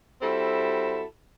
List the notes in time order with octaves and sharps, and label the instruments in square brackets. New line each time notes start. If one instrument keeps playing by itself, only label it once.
[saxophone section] G3 C4 E4 F#4 A4